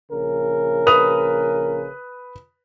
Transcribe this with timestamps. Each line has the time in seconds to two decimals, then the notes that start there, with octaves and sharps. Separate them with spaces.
0.11 A#1 C#3 A#4
0.87 B4 D#6 F7